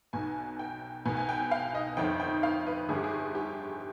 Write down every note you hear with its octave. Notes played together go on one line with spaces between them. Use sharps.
B1 B2 G#5
G5
C2 B2 G#5
G#5
G5
F5
D#5
G1 F2 D#3 G5
G5
F5
B4
G1 G2 D3 G#4
G4
G#4
G4